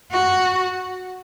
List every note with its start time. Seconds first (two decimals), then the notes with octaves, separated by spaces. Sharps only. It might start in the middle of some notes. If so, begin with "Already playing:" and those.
0.11 F#4